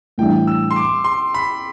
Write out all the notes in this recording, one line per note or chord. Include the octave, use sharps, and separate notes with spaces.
A2 E3 G3 D4 G5
E6
C6
D6
C6
B5